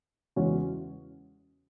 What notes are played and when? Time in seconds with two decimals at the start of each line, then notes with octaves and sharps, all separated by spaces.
0.36 E2 C#3 G#3 C#4 F#4